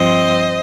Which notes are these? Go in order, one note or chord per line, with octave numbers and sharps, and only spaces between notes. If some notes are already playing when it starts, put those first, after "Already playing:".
Already playing: G2 F3 C4 C5 D#5